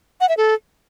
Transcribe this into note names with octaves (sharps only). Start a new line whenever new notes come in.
F#5
E5
A4